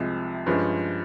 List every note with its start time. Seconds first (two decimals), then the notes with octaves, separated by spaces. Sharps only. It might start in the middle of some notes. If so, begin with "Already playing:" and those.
Already playing: C2 C3 F3 G#3
0.46 G2 F3 G#3 C#4